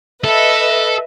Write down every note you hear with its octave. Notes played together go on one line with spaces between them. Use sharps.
A4 B4 D#5 E5